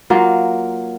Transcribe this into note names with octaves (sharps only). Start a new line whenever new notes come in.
F#3 A#3 F4